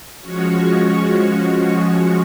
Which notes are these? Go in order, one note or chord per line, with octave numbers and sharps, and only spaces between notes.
F3 G#3 C#4 F#4 C#5